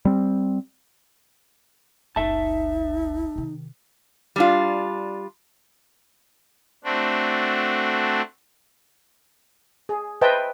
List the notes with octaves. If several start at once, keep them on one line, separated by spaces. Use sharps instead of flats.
G3 C4
F#1 C#2 D#4 E5 A5
C3 D#3
G3 D4 F4
A3 C4 D4 F#4
G#4
B4 C5 D#5 E5 G5 A5